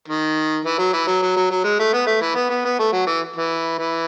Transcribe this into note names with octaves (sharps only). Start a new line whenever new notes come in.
D#3
E3
F#3
E3
F#3
F#3
F#3
F#3
G#3
A3
B3
A3
E3
B3
B3
B3
A3
F#3
E3
E3
E3